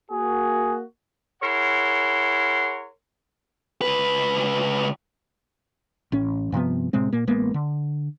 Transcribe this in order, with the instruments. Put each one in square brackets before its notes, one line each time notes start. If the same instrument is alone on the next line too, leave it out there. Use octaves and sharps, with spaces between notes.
[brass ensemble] A#3 F#4 [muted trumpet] G#4
[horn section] E4 G#4 A#4 C#5 F#5 C6
[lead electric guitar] C#2 B4
[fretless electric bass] A1 A2 C#4
G2 C3 F3 B3
A2 C3 G#3 C4
A#2 A#3
A1 G#3 A#3 B3
D3